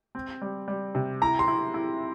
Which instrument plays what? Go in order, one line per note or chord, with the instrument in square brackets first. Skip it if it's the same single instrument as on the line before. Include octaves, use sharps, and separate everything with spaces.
[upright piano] C4
G3
G3
C3
[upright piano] E4 [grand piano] A#5
[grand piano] C6
[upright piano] E4
E4